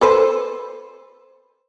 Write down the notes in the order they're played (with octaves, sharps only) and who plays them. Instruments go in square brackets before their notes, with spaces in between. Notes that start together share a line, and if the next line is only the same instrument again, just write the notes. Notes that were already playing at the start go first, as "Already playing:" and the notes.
[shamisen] A4 B4 C5